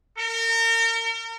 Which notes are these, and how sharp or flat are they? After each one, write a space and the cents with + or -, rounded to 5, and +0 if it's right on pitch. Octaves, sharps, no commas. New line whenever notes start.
A#4 -35